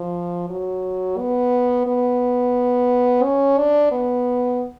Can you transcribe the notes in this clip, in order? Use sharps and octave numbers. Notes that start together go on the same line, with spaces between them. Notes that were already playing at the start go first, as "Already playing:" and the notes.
Already playing: F3
F#3
B3
B3
C#4
D4
B3